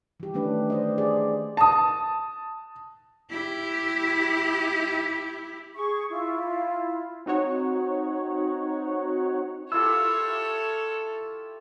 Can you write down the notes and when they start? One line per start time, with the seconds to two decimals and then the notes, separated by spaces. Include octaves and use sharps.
0.20 E3 G4
0.34 D#3 A3 C#4 D4 B4
0.70 C5 D5 D#5
0.98 G#4 D5
1.57 A5 D#6
3.30 E4 G4
5.75 G#4 C#6
6.10 E4 F4
7.26 C4 D#4 F#4 C#5 F#5
9.72 E4 F4 G4 A4 C#5 E6